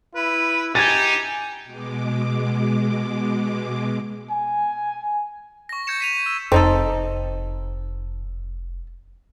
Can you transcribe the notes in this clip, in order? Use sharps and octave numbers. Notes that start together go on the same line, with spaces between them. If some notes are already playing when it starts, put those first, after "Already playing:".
E4 B4
D#4 G4 G#5 G#6 A6
B2 G#3 D6
G#5
C#6 A#6
G6 G#6 A#6 C#7 E7
B6 D#7 F7
E6
F1 F2 C4 D#4 A4